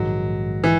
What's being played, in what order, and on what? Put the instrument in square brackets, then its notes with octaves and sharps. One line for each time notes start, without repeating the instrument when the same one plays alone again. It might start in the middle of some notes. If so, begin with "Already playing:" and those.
Already playing: [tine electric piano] A#1 G#2 D#3 G#3 [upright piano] F#3
[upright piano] E3